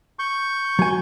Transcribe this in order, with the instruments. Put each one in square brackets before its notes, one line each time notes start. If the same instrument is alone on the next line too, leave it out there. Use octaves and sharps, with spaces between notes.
[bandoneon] C#6 G6
[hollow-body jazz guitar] F#3 G#5